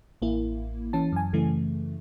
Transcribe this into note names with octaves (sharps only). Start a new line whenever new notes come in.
A1 A#3 E4
E3 C#4 A5
F#2 G#5
F#2 C#3 E3 A3